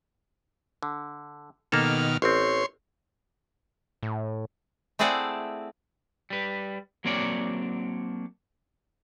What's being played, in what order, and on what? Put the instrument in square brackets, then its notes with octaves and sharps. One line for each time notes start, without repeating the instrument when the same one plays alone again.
[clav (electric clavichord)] D3
[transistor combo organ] B2 D#3 F6 [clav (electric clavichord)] A#3 A4
[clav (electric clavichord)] A1 C4 [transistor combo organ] C#5 C6
[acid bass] A2
[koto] A3 C4 E4 G#4 D5 F#5
[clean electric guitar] G3 B4
F#3 A#3 C4 D4 C#5 D5